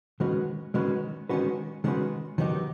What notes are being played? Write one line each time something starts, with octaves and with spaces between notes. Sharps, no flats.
D#3 G#3 C#4 F#4 B4
D#3 G#3 C#4 F#4 B4
D#3 G#3 C#4 F#4 B4
D#3 G#3 C#4 F#4 B4
D#3 F#3 B3 D#4 G4